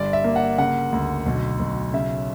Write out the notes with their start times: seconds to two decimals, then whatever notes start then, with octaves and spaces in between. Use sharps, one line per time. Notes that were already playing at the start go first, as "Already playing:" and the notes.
Already playing: G1 D5
0.13 E5
0.24 A#3
0.36 F#5
0.58 C#3 F#5
0.92 D2
1.26 B1
1.60 B1
1.93 C#3 E5